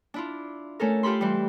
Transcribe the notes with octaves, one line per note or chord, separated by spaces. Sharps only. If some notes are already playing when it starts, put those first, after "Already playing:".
D4 E4 F4
A3 C#4 A4 A#4
F4 G4 A4 B5 C6
E3 G3